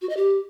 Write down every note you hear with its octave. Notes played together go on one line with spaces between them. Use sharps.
F#4
D#5
G4